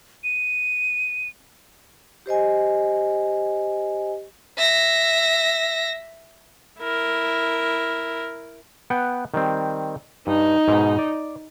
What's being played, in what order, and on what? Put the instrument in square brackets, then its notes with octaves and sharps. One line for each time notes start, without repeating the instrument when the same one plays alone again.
[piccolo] D#7
[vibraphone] G4 C5 D#5 G#5
[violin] E5 A#6
[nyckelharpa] E4 A#4
[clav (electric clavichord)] B3 F#5 G5
D#3 G3 C4
[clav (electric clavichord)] G2 [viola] D#4
[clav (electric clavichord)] G#2 B2
D5